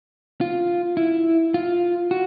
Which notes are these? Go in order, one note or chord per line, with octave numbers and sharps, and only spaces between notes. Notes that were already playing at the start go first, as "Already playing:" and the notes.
F4
E4
F4
F#4